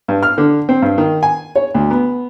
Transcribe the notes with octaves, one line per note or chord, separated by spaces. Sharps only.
G2
F6
D3
C4
G2
D#3
G#5
C#5
D2
B3